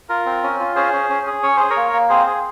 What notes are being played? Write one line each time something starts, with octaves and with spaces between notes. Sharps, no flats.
F4 A#4
C4
C#4
F4
C#4 G#4 C5
C#4
C#4
G#4
C#4 C#5
G#4 C5
A#4 C#5
A#3
A#3
C4 G#4 C5
G#4